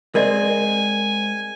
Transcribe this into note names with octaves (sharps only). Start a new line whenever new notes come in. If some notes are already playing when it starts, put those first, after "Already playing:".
G#3 C4 A#4 D5 D#5 G#5